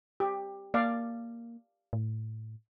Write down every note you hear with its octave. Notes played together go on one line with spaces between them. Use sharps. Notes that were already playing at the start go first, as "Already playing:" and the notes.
G4
A#3 D5 F5
A2